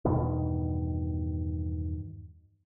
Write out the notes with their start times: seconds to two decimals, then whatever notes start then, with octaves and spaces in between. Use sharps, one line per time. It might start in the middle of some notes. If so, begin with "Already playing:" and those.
0.05 E2 G2 B2 D#3